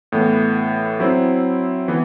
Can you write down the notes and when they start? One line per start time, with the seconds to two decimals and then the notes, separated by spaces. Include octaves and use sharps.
0.12 A2 E3 B3
1.00 F#3 C4 E4
1.88 E3 B3